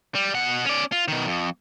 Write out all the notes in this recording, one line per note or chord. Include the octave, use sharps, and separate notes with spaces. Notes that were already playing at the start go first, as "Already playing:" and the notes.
G3
B2 F#5
C#4 D5
F4
B2 D#3
F2